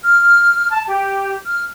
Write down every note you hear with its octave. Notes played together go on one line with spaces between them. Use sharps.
F6
A5
G4
F6